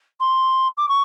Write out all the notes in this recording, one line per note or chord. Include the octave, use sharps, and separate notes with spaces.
C6
D6
C#6